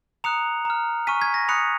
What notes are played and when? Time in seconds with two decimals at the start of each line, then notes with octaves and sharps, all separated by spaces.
0.24 A#5 D#6 F#6 C#7 F7
0.65 A#5 F6
1.07 G#5 C#6 F6 B6 D#7
1.21 G#6 B6
1.34 A#6
1.48 B5 D#6 F#6 C#7 F7